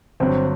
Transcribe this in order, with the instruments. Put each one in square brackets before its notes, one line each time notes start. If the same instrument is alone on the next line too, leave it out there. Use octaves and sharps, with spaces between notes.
[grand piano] G1 G2 F#3 [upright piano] C4